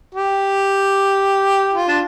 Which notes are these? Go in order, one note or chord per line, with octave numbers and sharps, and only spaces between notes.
G4
F4
D4